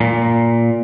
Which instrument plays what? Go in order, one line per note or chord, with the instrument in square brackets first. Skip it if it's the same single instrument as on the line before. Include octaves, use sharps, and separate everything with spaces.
[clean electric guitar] A#2